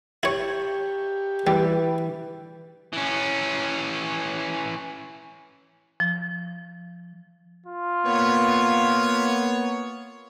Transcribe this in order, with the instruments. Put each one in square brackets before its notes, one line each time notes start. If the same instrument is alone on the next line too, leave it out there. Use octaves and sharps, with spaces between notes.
[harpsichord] E4 C#5 [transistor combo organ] G4
[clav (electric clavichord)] E3 [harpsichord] G3 [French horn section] B4
[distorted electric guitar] E3 C#4
[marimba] F3
[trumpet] F4
[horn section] A#3 B3 C#5